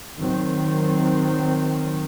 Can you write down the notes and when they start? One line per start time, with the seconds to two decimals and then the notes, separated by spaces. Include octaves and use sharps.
0.19 D#3 F#3 C4